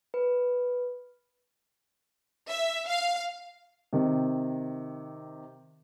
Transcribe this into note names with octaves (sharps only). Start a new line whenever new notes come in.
B4
E5
F5
C3 D#3